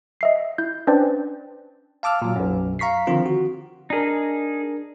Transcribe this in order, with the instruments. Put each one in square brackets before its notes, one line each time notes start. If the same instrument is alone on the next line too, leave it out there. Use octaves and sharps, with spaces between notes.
[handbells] D#5 E5 C7
E4 G6
C#4 D4 B4 C5 D5 G5
[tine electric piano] F5 A5 D6 E6 F6
A#2 F#3
B1 F#2
F5 A#5 C#6 B6 C7
D3 D#3 F3 C4 F4
F#4
[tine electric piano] D4 A#4 [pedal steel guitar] D#4 G#4